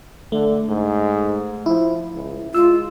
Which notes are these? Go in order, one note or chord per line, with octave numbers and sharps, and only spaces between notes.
D3 A3
G#2
F3 E4
C#2
G#3 F4 E6